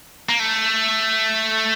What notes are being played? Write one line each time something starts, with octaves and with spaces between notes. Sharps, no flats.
A#3
A3